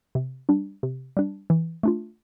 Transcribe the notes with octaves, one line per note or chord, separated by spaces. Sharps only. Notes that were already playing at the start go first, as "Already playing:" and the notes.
C3
G3 D4
C3
G3 D4
E3
A3 D4 F4